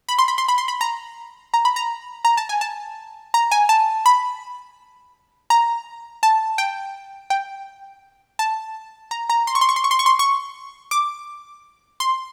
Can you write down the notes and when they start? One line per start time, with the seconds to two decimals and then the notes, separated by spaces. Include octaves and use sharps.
0.09 B5
0.18 C6
0.28 B5
0.38 C6
0.48 B5
0.58 C6
0.68 B5
0.81 A#5
1.54 A#5
1.65 B5
1.76 A#5
2.25 A#5
2.37 A5
2.49 G#5
2.61 A5
3.34 A#5
3.51 G#5
3.69 A5
4.06 B5
5.50 A#5
6.23 A5
6.58 G5
7.30 G5
8.39 A5
9.11 A#5
9.30 A#5
9.47 C6
9.55 C#6
9.61 C6
9.69 C#6
9.76 C6
9.84 C#6
9.91 C6
9.99 C#6
10.06 C6
10.19 C#6
10.91 D6
12.00 C6